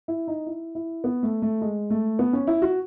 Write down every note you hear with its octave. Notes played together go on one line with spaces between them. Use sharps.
E4
D#4
E4
E4
B3
A3
A3
G#3
A3
B3
C#4
E4
F#4